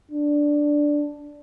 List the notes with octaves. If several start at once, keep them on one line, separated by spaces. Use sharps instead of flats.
D4